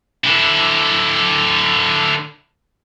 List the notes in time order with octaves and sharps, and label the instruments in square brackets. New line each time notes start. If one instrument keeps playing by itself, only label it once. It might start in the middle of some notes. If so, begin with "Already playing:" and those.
[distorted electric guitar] D3 E4